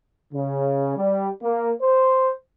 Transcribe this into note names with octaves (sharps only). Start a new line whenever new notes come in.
C#3
G3
A#3
C5